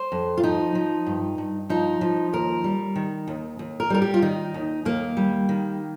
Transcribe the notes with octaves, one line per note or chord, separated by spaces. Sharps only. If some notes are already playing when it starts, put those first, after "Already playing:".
Already playing: C5
F2
F4
F3 D#4
F3
G2
G2
F3 D#4
F3
D#2 A#4
G3
D#3
D#2
D#2
A#4
G3 A#4
G4
F4
D#3 D#4
D#2
D#2 A#3
G3
D#3